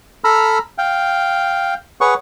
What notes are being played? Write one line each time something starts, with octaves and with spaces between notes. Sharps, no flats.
A4 A#5 B5 E6 F6
F5 G5
G#4 B4 C#5 F#5 C#6